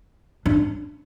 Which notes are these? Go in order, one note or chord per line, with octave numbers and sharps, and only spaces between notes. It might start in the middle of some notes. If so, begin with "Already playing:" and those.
D4